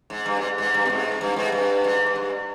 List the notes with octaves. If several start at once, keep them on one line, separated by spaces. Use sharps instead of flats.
G#2
G2
G#2
G#2
G2
B2
G#2
G2
G#2
G2
G#2
G#2
G2